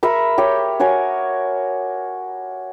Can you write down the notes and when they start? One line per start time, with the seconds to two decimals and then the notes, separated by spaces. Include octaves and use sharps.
0.03 A#4 E5 B5 C#6
0.38 G4 C#5 G5
0.80 F#4 A#4 C#5 G#5